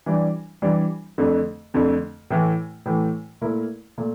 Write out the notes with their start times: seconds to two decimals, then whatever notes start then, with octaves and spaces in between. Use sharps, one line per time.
0.06 E3 G3 D4
0.62 E3 G3 D4
1.18 F2 D3 A3
1.74 F2 D3 A3
2.30 A2 E3 A3
2.86 A2 E3 A3
3.41 A#2 A3 E4 A#4
3.98 A#2 A3